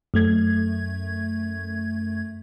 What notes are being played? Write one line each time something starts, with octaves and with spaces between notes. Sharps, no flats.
F#2 A3 G#6